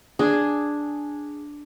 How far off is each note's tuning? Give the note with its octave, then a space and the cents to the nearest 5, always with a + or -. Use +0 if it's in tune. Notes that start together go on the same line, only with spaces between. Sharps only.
D4 +0 G#4 +0